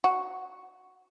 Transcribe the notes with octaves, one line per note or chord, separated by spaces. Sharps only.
F#4